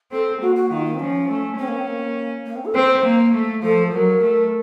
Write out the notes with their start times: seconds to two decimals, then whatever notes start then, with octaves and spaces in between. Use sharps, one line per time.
0.11 C4 A4
0.41 A#3 F#4
0.56 F#4
0.70 D#3 F4
0.85 A#3
0.94 C4
0.99 F3 C#4
1.29 A3
1.58 C4 C#4
1.68 A#3
1.77 C4
1.87 A#3
2.46 A#3
2.56 C4
2.65 A4
2.74 C4 C5
3.05 A#3
3.34 A3
3.62 F3 A4
3.92 F#3 A#4
4.22 A3